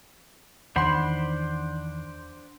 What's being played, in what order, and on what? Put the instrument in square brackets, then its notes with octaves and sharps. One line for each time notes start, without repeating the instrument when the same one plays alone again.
[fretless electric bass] E2 D#3 [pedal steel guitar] D4 C5 B5 [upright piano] F#5 C6